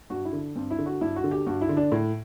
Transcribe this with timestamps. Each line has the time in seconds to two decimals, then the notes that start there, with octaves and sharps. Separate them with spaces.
0.10 G2 F#4
0.25 E4
0.33 D3
0.55 G2 C4
0.70 E4
0.79 D3
0.86 F#4
1.01 G2 E4
1.16 F#4
1.24 D3
1.31 G4
1.46 G2 F#4
1.61 E4
1.69 D3
1.77 D4
1.92 A2